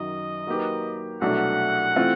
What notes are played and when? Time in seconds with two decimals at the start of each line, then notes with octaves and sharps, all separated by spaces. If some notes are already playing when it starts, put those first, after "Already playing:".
Already playing: F#2 D#3 F#3 D#5
0.47 F#3 A#3 D#4 G4 B4
1.21 C2 B2 F#3 A3 D4 F#5
1.96 E3 A3 C4 F4